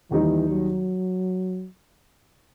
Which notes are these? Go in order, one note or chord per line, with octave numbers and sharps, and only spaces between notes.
D#2 D#3 E3 G3 D#4
F#3